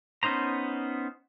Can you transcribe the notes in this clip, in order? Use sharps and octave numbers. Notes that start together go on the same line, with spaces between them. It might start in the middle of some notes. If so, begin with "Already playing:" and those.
B3 C#4 D#4 C5 A#5